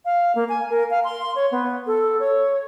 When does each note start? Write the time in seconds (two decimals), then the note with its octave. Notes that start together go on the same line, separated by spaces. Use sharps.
0.05 F5
0.35 A#3
0.49 G#5
0.70 A#4
0.90 F5
1.04 C6
1.36 C#5
1.52 B3
1.87 A4
2.20 C#5